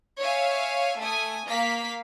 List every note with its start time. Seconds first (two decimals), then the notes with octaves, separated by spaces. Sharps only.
0.19 C#5 E5 F5 G#5
0.99 A3 G#5 D#6
1.48 A#3 F5 B6